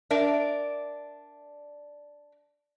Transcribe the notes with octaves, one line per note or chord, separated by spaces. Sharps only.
D4 A#4 D5 E5